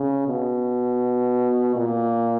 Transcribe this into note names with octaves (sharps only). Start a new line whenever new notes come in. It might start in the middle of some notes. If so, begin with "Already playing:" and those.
Already playing: C#3
B2
A#2